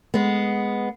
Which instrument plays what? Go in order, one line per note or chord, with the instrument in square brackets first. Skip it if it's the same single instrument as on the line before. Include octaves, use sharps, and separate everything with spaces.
[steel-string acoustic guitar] G#3 B3